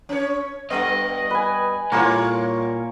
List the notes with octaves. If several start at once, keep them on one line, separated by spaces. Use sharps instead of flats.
C#4 C#5
G2 G3 B3 D#5
B4 G#5
A#2 G3 A#3 E4 F4 C#5